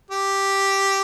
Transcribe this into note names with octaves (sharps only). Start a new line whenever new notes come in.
G4